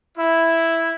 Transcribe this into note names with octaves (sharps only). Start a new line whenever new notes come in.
E4